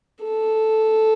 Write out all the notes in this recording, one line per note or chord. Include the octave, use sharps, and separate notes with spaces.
A4